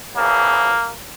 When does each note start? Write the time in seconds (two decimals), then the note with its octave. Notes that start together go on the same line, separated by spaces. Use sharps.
0.15 E2 C#3 F3 A#3